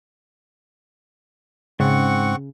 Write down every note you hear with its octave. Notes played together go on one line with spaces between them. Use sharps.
G#2 C#3 C4 F#5 C#6